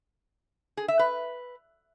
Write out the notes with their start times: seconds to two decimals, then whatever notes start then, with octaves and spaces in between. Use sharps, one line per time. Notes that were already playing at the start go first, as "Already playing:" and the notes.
0.77 G#4
0.88 E5
0.99 B4